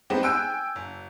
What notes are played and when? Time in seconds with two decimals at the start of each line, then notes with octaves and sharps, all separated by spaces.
0.10 G3 G#3 B3 C4 D#4
0.23 G5 G#5 E6 F#6 D7
0.76 F#1